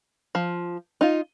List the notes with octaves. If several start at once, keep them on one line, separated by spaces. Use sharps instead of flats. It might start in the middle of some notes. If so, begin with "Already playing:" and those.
F3
D#4 F4